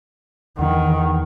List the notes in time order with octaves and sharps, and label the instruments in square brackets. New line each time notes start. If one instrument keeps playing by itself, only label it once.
[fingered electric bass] E2 [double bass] D#3 [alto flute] F#5